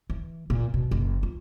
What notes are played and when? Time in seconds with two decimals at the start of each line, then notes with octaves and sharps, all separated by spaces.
0.10 E3
0.50 A#2
0.74 B2
0.91 F#1
1.23 F4